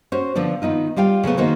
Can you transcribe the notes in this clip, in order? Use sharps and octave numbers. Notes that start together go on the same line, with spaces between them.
C#4 F#4 C5
D3 F3 B3 D4
D#3 B3 D#4 F4
G3 F4 F5 G5
C#3 F#3 A3 B3
D#3 A#3 F#4 C5